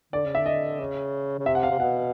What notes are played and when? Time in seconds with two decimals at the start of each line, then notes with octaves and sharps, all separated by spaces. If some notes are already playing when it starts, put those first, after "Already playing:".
0.13 D3 D5
0.26 C#3
0.35 D3 E5
0.46 D#5
0.80 C#3
1.39 C#3
1.46 C3 E5
1.55 F#5
1.63 F5
1.70 C3
1.79 B2 F#5